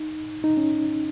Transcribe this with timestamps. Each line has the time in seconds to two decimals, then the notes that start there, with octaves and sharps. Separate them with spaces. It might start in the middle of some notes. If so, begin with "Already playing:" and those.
Already playing: D#4
0.44 D#4
0.57 C#4